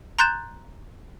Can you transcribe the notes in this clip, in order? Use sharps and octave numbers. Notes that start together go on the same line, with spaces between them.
A#5 C6 F#6 G6 A6 E7